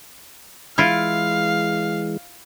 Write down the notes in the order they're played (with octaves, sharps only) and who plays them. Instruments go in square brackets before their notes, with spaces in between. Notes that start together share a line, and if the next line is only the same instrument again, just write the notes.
[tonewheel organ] E3 G#3 [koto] E4 F4 [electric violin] F5